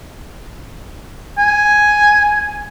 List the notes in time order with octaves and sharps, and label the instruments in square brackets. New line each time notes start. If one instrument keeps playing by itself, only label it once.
[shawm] G#5